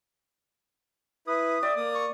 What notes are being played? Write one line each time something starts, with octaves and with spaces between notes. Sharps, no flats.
E4 B4 D#6
D5 E5 G5
A#3 D#6
C#6